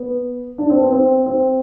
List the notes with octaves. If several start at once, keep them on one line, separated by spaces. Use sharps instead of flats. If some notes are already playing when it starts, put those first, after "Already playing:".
Already playing: B3
D4
C4
B3
C4
C4